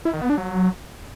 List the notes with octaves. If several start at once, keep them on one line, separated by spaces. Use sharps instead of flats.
E4
D#3
B3
D4
F#3